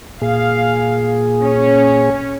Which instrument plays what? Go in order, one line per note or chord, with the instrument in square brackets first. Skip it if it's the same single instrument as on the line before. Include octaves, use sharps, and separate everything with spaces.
[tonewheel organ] A#2 G#4 [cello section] F5
[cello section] C#4